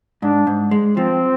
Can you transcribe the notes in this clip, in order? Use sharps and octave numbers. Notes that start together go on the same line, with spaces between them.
G#2 D4
G#2
G#3
F3 C4